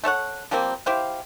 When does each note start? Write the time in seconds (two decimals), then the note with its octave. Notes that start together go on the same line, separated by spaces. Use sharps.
0.04 A3 A4 C#5 F#5
0.51 F3 G3 A#3 C4
0.86 E4 G4 C5 F5